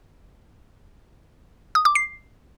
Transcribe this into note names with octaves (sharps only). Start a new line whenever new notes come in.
D#6
D6
C7